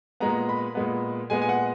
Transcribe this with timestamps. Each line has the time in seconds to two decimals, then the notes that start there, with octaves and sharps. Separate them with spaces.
0.20 A#2 G#3 B3 A#5
0.49 B5
0.75 A#2 G#3 B3
1.30 A#2 G#3 B3 G#5
1.42 G#5
1.49 F#5